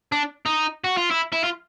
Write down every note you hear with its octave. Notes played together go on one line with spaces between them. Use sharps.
D4
D#4
F#4
F4
E4
E4
F4